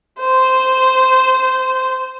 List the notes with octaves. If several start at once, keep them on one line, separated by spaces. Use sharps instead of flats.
C5